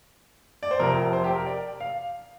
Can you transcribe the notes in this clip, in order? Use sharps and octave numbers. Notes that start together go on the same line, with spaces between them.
D5
C5
F1 F2 C3 A#4
C5
G4
A#4
D5
F5